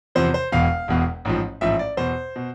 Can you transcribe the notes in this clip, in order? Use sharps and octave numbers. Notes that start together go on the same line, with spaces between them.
E2 C3 F3 C5
C5
E1 E2 B2 F5
E1 E2 B2
A1 G#2 F3
A1 G#2 F3 E5
D5
E2 B2 C5
B2